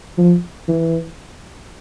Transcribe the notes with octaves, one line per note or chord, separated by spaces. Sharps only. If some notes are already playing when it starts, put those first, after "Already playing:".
F3
E3